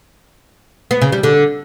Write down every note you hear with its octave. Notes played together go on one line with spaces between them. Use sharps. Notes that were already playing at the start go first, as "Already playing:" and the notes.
B3
C#3
G3
D3